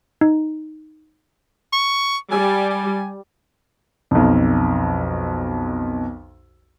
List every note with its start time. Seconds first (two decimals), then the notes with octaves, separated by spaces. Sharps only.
0.21 D#4
1.73 C#6
2.31 G3 G#5
2.70 G#5
4.11 B1 F2